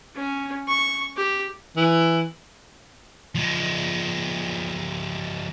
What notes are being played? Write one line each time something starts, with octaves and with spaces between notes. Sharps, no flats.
C#4
C#6
G4
E3
F3 G#3